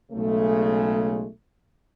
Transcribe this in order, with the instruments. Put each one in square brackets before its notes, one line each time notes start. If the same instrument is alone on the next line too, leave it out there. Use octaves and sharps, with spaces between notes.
[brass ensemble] B1 C#3 G#3 A3